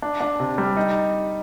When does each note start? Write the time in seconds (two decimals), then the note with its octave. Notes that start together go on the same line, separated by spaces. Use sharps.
0.02 D4
0.20 D4
0.40 C3
0.58 G3
0.77 D#4